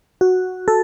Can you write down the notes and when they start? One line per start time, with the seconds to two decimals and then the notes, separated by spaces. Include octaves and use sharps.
0.21 F#4
0.68 A4